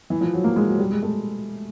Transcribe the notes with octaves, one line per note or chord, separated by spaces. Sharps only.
E3
F3
F#3
A#3
G#3
F#3
G3
G#3
A3